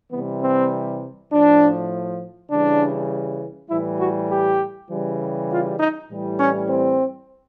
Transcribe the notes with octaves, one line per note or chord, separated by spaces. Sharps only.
C3 E3 G3 B3
C4
A2 F3 D4
C#3 E3 G3 D4
A2 E3 G3 E4
F#4
G4
C#3 E3 G3
F4
D#4
A2 E3 G3
C#4
C4